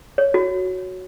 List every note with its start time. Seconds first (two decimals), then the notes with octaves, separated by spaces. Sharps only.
0.18 C#5
0.34 F#4